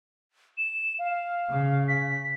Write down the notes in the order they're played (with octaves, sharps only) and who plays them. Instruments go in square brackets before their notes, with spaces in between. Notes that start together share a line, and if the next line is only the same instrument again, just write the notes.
[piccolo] E7
F5
[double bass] C#3
[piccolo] B6